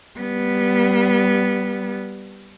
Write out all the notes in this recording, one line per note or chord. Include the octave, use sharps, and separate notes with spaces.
G3 B3